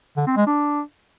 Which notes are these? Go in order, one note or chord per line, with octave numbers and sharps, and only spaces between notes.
D3
C4
G#3
D4